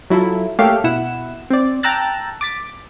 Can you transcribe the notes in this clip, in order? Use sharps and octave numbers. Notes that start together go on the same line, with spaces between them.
F#3 E4 F4 A4
A3 A#3 G4 A4 C#5 F5
B2 E4 F#5 E7
C4 D5
G5 A5 A#5 E6 F#6 A6
D6 A6 B6